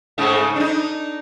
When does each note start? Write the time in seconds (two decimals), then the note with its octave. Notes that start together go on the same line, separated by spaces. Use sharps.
0.18 G#2 C#3 A3
0.56 D4 D#4